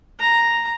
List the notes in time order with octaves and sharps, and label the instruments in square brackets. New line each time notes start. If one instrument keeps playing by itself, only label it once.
[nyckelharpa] A#5